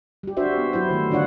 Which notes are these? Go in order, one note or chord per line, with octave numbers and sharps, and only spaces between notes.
G3 G4
D4 F#4 C5 E5
B3
F#3 E4 C5
D#3 A3
D3 D4 F4 C#5 F#5